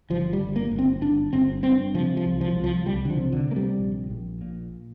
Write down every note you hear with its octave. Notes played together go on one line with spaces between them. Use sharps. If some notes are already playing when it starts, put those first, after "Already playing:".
G1 F3
G3
G1
A#3
G1
C4
G1 D4
G1 C4
G2 C4
C3 F3
F3
C2
F3
C2
F3
C2 G3
D3
F3
C3
D3
C3 A#3
G3
A#1
A#1
A#2